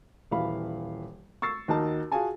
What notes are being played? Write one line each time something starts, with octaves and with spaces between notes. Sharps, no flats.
D#1 E3 F5 B5
C#6 E6 A6 C7
D#2 D#4 F#4 A#4 A5 A#5
F4 F#4 G#4 F5 G#5 A5